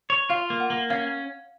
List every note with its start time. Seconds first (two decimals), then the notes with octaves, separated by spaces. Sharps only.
0.10 C#5
0.30 F4 F5
0.50 A#3
0.60 F#5
0.70 A#3
0.90 C#4 F5